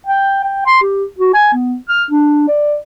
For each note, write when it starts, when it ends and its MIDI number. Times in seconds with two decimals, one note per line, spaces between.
0.07 0.41 79
0.44 0.62 79
0.66 0.82 84
0.82 1.05 67
1.19 1.34 66
1.34 1.50 80
1.54 1.76 59
1.89 2.04 89
2.11 2.46 62
2.48 2.77 74